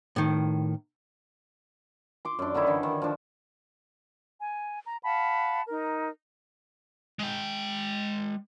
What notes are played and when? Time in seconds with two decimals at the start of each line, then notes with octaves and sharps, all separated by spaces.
0.16 A2 D#3
2.25 C6 D6
2.39 F#2 D4
2.54 D3 D#3 D#4 E4
2.67 D3 E3
2.83 D#3
3.02 F3 D4
4.40 G#5
4.86 A#5
5.03 F5 F#5 A5 B5
5.69 D#4 A#4
7.19 G#3 G5